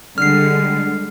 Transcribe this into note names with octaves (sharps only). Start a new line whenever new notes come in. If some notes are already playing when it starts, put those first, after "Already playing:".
D3 G3 G#3 F6 C7